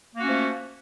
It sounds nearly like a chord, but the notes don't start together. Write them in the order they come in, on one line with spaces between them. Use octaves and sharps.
A#3 F#4 C#4 A3 F3